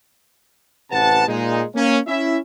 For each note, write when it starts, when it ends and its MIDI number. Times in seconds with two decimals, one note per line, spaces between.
0.91 1.25 33
0.91 1.25 48
0.91 1.25 52
0.91 1.25 71
0.91 1.25 78
0.91 1.25 81
1.28 1.61 46
1.28 1.61 56
1.28 1.61 63
1.74 1.97 58
1.74 1.97 61
2.07 2.37 61
2.07 2.37 64
2.07 2.37 76